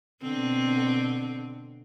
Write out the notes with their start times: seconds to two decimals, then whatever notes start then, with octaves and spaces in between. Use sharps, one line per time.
0.22 B2 D3 C4